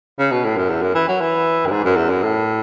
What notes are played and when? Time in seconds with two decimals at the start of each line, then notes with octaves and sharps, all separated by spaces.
0.19 C#3
0.32 B2
0.44 A2
0.56 F#2
0.69 E2
0.82 F#2
0.95 E3
1.08 F#3
1.21 E3
1.66 F#2
1.71 G#2
1.84 F#2
1.96 E2
2.09 F#2
2.22 A2